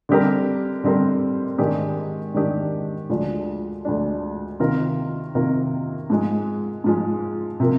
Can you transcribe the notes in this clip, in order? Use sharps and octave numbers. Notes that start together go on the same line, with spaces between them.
D3 G3 C4 G4 A#4
D3 G3 C4 G4 A#4
G#2 D#3 G#3 D4 G4
G#2 D#3 G#3 D4 G4
D2 D3 F3 G#3 D4
D2 D3 F3 G#3 D4
C3 D#3 A#3 F4 A#4
C3 D#3 A#3 F4 A#4
G#2 F3 G#3
G#2 F3 G#3
C3 F3 A#3